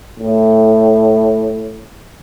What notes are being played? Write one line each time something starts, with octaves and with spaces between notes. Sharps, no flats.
A2